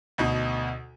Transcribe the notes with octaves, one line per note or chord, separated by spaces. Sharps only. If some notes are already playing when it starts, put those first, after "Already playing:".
D2 B2 D#4